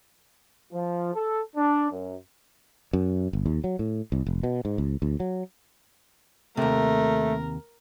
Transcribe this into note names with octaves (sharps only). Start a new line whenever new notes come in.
F3
A4
D4
F#2
F#2
G1
D#2
F#3
A2
C2
F1
B2
G#2
C#2
D2
F#3
D#2 C3 A3 A#4